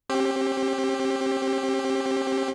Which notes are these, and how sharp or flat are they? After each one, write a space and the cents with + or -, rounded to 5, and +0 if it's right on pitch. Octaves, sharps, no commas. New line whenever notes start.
C4 +40 G4 +0